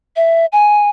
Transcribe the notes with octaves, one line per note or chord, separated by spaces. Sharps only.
E5
G#5